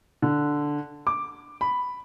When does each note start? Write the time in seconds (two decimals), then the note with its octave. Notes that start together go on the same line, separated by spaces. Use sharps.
0.22 D3
1.07 D6
1.61 B5